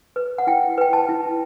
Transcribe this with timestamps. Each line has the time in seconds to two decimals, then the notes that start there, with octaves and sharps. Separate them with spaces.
0.16 B4
0.38 F#5
0.47 E4 G5
0.78 B4 G5
0.93 A5
1.09 E4